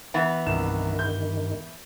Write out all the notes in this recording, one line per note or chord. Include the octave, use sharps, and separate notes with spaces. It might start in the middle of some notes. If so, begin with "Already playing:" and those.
E3 B3
C2 G2 D#3 E7
G6